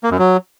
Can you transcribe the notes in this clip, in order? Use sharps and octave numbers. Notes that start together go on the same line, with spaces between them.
A#3
F#2
F#3